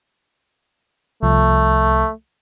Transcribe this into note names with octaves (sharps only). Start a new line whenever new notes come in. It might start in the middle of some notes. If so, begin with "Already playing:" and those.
C2 F3 A3